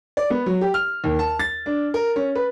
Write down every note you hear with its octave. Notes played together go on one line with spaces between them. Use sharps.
D5
B3
F#3
G4
F6
D#2
A5
A6
D4
A#4
C#4
B4